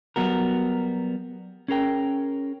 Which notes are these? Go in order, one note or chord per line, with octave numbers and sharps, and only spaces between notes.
F#3 G3 B3 F#4 A#4
C#4 G#4 A#4 G5